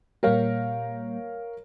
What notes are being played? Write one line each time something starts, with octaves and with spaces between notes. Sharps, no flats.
A#2 G3 A#3 A#4 C#5 F5